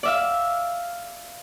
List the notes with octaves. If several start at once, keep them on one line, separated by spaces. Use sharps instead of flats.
D5 E5 F5